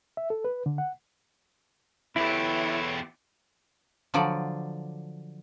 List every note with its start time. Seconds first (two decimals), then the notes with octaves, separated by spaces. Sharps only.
0.17 E5
0.30 A4
0.45 B4
0.66 D3
0.78 F#5
2.16 E2 E4 G4 A4 B4 C#5
4.14 D3 F3 F#3 D5